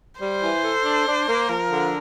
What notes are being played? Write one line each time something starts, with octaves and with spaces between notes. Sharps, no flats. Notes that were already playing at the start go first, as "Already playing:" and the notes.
G3 C5
E3
A4
D4
D4
A#3
F3 A#4
D3